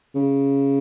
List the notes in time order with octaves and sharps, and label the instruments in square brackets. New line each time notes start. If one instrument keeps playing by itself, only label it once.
[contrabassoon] C#3